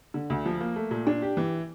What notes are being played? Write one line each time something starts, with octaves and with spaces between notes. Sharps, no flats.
D3
D2
F3
A#3
A3
A#2
D4
G4
E3